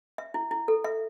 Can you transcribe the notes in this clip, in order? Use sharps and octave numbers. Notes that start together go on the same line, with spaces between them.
E5
E4
E4
A4
E5